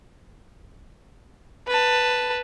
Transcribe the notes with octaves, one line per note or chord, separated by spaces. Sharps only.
B4 A5